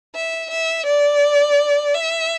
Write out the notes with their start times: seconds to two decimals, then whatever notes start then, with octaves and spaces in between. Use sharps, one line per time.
0.15 E5
0.51 E5
0.86 D5
1.94 E5